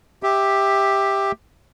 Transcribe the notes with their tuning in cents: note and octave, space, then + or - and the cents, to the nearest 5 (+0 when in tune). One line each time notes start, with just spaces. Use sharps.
G4 +10 E5 -10